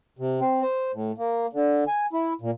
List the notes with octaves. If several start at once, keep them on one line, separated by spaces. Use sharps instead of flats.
C3
C4
C5
A2
A#3
D3
G#5
E4
A#2